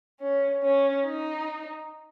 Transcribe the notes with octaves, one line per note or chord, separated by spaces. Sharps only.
C#4
C#4
D#4